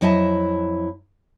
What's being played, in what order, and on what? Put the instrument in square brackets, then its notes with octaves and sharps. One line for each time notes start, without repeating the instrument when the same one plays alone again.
[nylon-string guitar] F2 F#3 E4 D#5 E5 A5